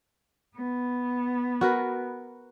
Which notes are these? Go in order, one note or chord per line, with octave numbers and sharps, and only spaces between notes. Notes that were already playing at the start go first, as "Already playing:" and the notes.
B3
F#4 A#4 B4